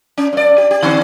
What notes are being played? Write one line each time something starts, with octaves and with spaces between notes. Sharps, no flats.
C#4
G2 D5
G4
G4
D3 C4